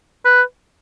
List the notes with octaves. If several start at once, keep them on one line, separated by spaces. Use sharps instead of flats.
B4